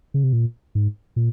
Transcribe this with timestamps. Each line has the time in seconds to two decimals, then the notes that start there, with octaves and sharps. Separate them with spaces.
0.14 C#3
0.24 C3
0.33 A#2
0.75 G#2
1.16 A#2